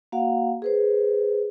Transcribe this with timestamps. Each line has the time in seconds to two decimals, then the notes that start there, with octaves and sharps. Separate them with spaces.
0.12 A#3 F#4 F5 F#5
0.62 G#4 B4 C5